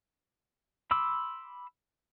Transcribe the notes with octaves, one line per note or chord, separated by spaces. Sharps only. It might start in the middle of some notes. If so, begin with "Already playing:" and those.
B5 C6 D6 E6